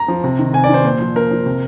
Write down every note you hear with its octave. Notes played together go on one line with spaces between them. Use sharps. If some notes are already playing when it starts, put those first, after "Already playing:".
Already playing: A#5
F3
C3
D#3
C3 G#5
D5
D#3 C5
A#2 C5
F3
A#2 A#4
F3
C3